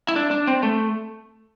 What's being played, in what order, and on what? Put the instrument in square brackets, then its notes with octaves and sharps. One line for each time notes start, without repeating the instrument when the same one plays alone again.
[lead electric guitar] E4
D4
D4
C4
A3